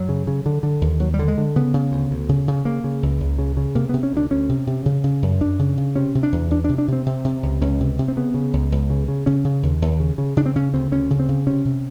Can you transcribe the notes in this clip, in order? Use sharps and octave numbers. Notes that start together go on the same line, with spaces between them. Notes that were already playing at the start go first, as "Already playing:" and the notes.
Already playing: F#2 F#3
C#3
C#3
D3
D3
D#2
D#2 F#3
G3
D3
G#3
D3
C#3 B3
C#3
D2
D2
C#3
C#3
C#3 A#3
C#3
C#2
C#2
C#3
C#3
C3 A#3
C3 B3
C#4
D2 D4
D2 C#4
C3
C3
C#3
C#3
F#2
F#2 D4
C#3
C#3
C3 C#4
C3
D4
E2
E2 D4
C3 D4
D4
C3 C4
C3 C4
C3
C#2
C#2 C#4
C3
C3
C4
C#3 B3
C#3
C#2
C#2
C#3
C#3
C#3 C#4
C#3
D#2
D#2
C#3
C#3
C#3 D4
C4
C#3 C#4
D2 C4
D2 C#4
C#3
C4
C#3
C3 C#4
C3